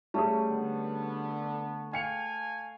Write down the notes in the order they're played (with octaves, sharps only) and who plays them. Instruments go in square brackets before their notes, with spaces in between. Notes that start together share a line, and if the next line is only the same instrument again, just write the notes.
[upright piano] G3 C#4 G#4 [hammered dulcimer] A3
[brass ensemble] D3 B3
[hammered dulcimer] F5 [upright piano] G5 C#7 F7 [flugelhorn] G#5